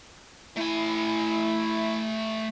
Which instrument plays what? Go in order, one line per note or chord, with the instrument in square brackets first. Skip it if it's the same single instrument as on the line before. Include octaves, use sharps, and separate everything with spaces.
[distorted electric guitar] A3 G#5 [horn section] E4